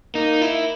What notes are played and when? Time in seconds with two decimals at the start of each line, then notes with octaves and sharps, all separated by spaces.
0.14 A#3 D#4
0.41 E4